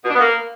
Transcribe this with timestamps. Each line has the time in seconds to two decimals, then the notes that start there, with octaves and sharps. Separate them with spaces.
0.04 B2
0.10 D4
0.15 B3
0.20 A#3